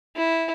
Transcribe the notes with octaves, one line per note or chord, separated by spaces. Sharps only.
E4